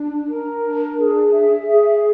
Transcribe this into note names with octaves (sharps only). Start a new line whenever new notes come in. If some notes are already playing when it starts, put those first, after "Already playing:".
Already playing: D4
A#4
D4
G#4
E5
G#4